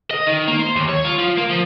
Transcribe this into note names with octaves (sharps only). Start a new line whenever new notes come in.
D#5
D#3
A#3
C5
D#2
C#5
F4
F3
A#3
F3